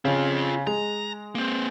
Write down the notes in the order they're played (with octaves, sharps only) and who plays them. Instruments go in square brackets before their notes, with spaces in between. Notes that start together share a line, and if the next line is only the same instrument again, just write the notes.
[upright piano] C#3 [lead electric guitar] C4 F4
[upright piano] G#3 [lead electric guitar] A#5
[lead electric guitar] A#3 C4